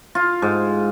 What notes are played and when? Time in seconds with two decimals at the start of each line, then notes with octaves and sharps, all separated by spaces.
0.15 F4
0.42 G#2